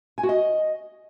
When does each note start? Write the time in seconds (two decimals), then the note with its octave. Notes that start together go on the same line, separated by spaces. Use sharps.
0.18 G#5
0.23 F#4
0.29 D#5